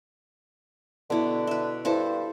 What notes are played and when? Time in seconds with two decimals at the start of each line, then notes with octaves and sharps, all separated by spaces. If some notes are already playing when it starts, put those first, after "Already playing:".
1.10 B2 D3 E4
1.47 B4 E5
1.85 G2 E4 A4 C5